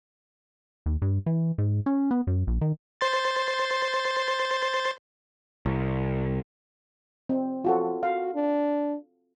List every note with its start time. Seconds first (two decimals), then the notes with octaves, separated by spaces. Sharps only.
0.86 D#2
1.02 G2
1.26 E3
1.58 G#2
1.86 C#4
2.11 B3
2.27 F#2
2.47 A#1
2.61 D#3
3.01 C5 C6 A6
5.66 C2
7.29 C4
7.65 F3 F4 F#4 A4
8.03 F#4 F5
8.35 D4